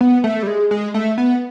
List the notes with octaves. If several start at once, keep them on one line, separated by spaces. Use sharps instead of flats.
B3
A3
G3
G#3
G#3
A3
B3